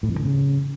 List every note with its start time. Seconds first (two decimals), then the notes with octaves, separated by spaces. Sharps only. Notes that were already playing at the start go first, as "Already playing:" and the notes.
0.03 A2
0.09 F2
0.14 G2
0.20 D3
0.25 C#3